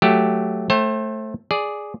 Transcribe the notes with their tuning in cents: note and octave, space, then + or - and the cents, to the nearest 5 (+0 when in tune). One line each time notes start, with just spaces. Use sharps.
F#3 +0 A3 +0 G4 +5
A3 +0 C5 +35 G5 -15
G#4 +0 D5 +0